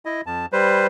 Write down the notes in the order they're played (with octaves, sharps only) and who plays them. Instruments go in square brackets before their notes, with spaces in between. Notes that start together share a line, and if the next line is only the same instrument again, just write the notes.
[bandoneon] E4 D#5
F2 A5
G3 B4 C5